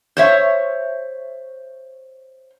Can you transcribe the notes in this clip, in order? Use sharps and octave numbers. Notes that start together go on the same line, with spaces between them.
C5 C#5 E5